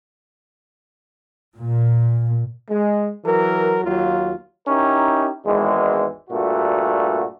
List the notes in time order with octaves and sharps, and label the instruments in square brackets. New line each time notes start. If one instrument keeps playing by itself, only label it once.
[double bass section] A#2
[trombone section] G#3
E3 F#3 A#4
D#2 F#3 F4
C#4 D#4 E4 G4 A#4
G#1 E2 E3 G#3
G2 A#2 A3 F#4